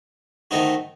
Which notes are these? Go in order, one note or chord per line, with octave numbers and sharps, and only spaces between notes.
D#3 A3 C4 D#4 F#4